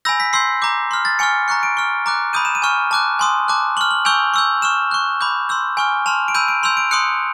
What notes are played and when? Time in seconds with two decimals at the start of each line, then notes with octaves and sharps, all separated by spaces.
0.05 G#5 B5 E6 G6 A#6
0.20 B6
0.33 C6 E6 G6 C7
0.62 A#5 D6 G6
0.91 C6 F6
1.05 A6
1.19 G#5 C#6 F6 C#7
1.48 A#5 C#6 F#6 C#7
1.63 D7
1.77 C#6 F6
2.06 A#5 D6 F#6
2.33 B5 D#6 G6 D#7
2.45 E7
2.55 D#7
2.62 G#5 C#6 F6
2.91 A5 D6 F#6
3.19 G#5 C6 D#6
3.48 A5 D6 F#6
3.77 C#6 F6 F#7
3.91 F#7
4.05 G#5 C#6 E6 G6 F7
4.34 C#6 E6 G6
4.62 C#6 F6 E7
4.91 C#6 F#6
5.21 B5 D6 G6
5.49 C6 E6 G6
5.77 G#5 C#6 F6
6.06 A5 C6 F6 F7
6.28 D7
6.34 B5 E6 G6 D#7
6.48 D7
6.63 C6 E6 G6 F7
6.77 D7
6.91 C6 D#6 F#6 C#7